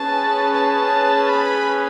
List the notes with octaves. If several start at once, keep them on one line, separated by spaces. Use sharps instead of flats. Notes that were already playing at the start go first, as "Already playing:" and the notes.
Already playing: C#4 G#4 B4 A5
A5
B5